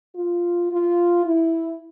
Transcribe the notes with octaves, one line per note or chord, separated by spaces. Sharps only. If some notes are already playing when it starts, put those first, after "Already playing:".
F4
F4
E4